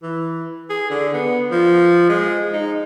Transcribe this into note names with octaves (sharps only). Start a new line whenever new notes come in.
E3
G#4
D3
B3
F3
G#3
D#4